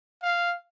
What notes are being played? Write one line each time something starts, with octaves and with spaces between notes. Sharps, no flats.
F5